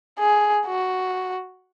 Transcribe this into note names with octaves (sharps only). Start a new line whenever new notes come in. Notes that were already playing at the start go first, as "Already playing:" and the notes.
G#4
F#4